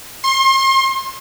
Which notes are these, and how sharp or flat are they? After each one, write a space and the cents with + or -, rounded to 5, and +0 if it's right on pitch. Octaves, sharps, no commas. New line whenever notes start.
C6 +30